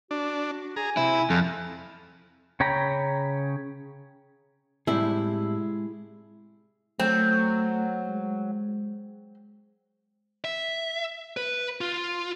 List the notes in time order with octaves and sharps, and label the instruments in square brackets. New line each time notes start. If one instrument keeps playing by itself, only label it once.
[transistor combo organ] D4 [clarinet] F#4
[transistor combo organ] G#4 A#5 [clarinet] G#5
[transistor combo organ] C3 [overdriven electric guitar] E4
[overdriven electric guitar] F2 [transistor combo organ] A4 F5
[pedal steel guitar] C#3 C#5 G5 A#5 B5
[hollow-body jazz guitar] A2 C3 G3 [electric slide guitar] G#3 G#4 [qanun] E4
[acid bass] F#3 [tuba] A3 [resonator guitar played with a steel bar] C4
[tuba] G#3
[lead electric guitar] E5
B4
F4